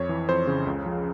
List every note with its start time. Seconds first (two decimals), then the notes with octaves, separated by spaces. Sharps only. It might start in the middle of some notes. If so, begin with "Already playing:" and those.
Already playing: F2 C#5
0.09 E3
0.29 F2 C5
0.47 C#3
0.67 C#2
0.86 F3